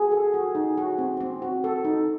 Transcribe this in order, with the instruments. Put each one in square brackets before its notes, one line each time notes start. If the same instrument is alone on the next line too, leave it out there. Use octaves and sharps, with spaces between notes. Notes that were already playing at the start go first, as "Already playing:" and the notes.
Already playing: [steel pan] F#4 [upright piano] G#4 G#5
[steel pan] A4
F#4
D#4
F#4
C4
C4
F#4
A4
D#4